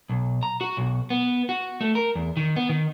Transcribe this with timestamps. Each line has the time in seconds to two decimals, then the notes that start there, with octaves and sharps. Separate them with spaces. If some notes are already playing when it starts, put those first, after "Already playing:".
0.09 B1
0.43 A#5
0.61 F#4
0.77 B1
1.10 B3
1.49 F#4
1.81 A3
1.95 A#4
2.15 E2
2.37 D#3
2.56 B3
2.69 D#3